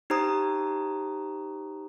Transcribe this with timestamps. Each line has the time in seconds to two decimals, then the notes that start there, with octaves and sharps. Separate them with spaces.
0.10 D#4 G4 C5 A#5 D#6